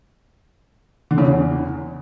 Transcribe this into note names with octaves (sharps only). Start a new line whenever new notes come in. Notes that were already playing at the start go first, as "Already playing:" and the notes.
D3
C#3
E2